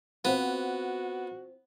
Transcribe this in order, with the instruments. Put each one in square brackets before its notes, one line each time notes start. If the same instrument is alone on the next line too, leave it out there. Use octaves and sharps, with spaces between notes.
[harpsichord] B3 [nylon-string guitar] C4 F4 C5 [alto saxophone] F#4